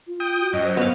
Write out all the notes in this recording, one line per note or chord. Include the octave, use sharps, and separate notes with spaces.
F4
G5 D#6
F#4
F#2 D#5
C5
B3 F5